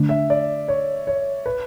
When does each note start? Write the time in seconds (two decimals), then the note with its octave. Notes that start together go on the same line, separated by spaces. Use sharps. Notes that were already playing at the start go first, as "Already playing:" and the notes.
Already playing: D3 A3 D4
0.09 E5
0.30 D5
0.68 C#5
1.07 C#5
1.46 B4